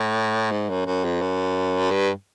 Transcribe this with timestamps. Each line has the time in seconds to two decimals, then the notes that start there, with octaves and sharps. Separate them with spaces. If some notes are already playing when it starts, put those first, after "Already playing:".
Already playing: A2
0.51 G#2
0.70 F#2
0.86 F#2
1.04 F2
1.22 F#2
1.91 G2